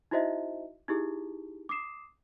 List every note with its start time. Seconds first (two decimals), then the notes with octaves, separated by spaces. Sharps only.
0.11 D#4 E4 F#4 C5 D#5 E5
0.88 D#4 E4 G4 G#4
1.69 D6 D#6 C7 E7